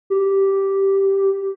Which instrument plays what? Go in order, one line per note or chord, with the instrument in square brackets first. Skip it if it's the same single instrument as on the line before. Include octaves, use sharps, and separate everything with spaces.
[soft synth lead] G4